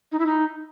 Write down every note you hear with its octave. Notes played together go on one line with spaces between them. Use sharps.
D#4
E4
D#4